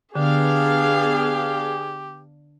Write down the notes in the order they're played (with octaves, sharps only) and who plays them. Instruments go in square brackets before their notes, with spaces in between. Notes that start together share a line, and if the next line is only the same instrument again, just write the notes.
[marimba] D3 [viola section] B3 D4 F5 [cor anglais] G4 [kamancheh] G#4